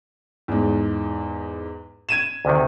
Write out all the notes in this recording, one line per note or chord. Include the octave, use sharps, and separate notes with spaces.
E2 G#2
G#6 D#7 E7
D2 C3 D#3